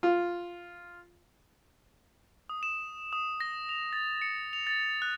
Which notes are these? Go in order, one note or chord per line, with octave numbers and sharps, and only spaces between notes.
F4
D#6
E7
D#6
A#6
F7
A6
C#7
F7
A6
F#6